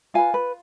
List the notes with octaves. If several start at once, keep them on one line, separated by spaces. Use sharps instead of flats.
F4 B4 F5 G#5
B4